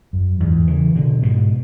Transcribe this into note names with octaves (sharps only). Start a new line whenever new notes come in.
F#2
E2 G#2
C#3 E3
B2 D3
G#2 B2